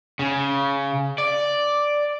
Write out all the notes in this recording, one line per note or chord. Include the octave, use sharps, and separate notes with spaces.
C#3
D5